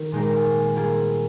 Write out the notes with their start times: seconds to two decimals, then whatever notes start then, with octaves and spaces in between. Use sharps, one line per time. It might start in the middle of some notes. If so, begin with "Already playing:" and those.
Already playing: D#3 A#3
0.12 A#2 G#3 D#4 G4 A#4
0.74 G3 A#3 F4 G#4